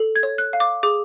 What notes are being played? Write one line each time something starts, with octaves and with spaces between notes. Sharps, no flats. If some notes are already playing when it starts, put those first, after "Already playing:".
Already playing: A4
G#6
C#5
F#6
F5
D6
G#4 D6